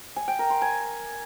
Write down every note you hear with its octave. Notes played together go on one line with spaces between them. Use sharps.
G#5
G5
A#4
C6
G#5